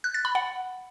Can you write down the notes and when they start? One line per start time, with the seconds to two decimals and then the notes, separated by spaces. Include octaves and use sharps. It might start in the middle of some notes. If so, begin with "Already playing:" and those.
0.04 F#6
0.14 A6
0.25 B5
0.35 F#5